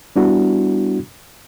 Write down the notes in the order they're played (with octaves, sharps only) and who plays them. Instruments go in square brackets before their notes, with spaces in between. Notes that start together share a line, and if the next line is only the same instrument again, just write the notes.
[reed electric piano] G3 B3 D4 E4 F#4